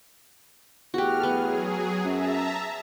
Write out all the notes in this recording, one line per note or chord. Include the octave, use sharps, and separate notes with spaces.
E2 A3 F#4 G4 F6
F#3 B3 G#4
F#2 E5 A5 A#5